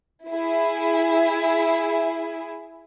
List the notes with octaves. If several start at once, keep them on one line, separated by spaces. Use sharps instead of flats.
E4 G#4